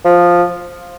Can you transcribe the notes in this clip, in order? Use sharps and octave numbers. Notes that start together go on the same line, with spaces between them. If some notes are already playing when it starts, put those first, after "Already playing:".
F3